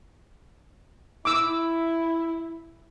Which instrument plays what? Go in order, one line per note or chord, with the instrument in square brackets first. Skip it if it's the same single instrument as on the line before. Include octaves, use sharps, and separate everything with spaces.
[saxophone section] E4 [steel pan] D6 E6